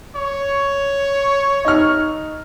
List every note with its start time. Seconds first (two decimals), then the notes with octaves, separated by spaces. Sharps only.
0.16 C#5
1.65 D#4 F6